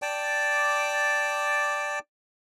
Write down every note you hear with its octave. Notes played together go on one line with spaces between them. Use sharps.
D5 G5 A5 D6